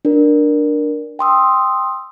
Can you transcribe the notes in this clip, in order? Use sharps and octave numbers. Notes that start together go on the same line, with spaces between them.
D4 A#4
G5 C6 D#6 E6